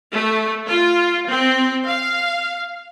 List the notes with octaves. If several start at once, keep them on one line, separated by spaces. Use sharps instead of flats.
A3
F4
C4
F5